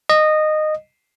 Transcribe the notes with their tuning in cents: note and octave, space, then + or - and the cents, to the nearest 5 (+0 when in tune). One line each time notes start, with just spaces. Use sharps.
D#5 -15